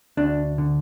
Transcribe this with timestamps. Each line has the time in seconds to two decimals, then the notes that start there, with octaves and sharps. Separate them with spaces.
0.17 D2 D4
0.58 D3